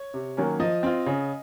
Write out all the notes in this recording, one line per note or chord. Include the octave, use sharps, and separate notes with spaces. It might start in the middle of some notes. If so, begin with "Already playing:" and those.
Already playing: C#5
C3
D#3 F#3 A#3 C#4
F3 D#5
C4 F4
C#3